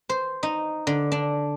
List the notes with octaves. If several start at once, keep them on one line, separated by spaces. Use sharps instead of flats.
C5
D#4
D3
D4